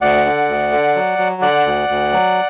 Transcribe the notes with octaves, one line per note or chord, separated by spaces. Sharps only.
D2 D5 F#5
D3
D2
D3
F#3
F#3
D3 D5 F#5
D2
D2
F#3